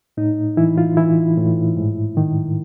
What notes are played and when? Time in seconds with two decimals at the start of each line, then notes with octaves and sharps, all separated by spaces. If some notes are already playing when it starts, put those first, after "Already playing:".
0.17 A2 D#4
0.57 E3 E4
0.78 F4
0.97 E3 E4
1.37 A2
1.77 G#2
2.17 D#3